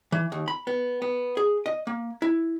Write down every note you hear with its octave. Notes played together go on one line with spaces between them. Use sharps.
E3
D#2
B5
B3
B3
G#4
D#5
A#3
E4